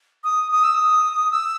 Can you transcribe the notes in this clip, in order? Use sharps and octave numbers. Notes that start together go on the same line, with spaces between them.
D#6
D#6
E6
D#6
E6